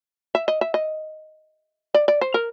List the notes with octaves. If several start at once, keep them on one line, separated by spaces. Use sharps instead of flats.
E5
D#5
E5
D#5
D5
D5
C5
A#4